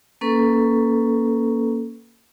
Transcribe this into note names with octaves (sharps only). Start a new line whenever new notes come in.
A#3 C#4 A4 B4